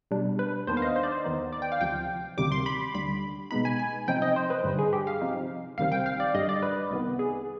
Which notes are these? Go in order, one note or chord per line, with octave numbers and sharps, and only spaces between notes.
B2 G3 D4
B4
D#2 D#3 B3 D4 C5
F5
D#5
C5
D5
C5
D#2 D#3 B3 D#4
D5
G5
F5
D2 C3 F3 G5
D2 C3 D#3 G3 D6
C6
B5
D2 D3 G3 B5
B2 G#3 B3 D#4 B5
G#5
G#5
C3 F3 C4 D#4 G5
D#5
C5
B4
G2 D3 G3
G#4
G4
F5
C3 F3 C4 D#4
C2 C3 D#3 G3 C4 F5
G5
F5
D5
G2 D3 G3 D#5
D5
B4
C2 C3 D#3 B3
G#4